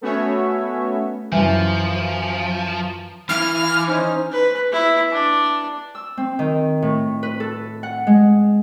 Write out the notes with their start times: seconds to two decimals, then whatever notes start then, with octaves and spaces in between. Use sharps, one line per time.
0.01 A3 B3 C#4 F#4 C#5 E5
1.32 F#2 E3 F3
3.29 E3 F6
3.88 C#4 D#4 C5
4.32 B4
4.72 E4
5.12 D4
5.95 E6
6.18 C4
6.39 D#3
6.82 A2
7.23 B4
7.40 A4
7.83 F#5
8.07 G#3